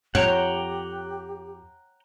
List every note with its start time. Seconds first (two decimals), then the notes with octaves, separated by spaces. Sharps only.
0.15 F2 G4 C#5 F#5 G5 A#5